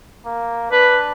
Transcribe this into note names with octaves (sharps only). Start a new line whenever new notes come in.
A#3
D4 B4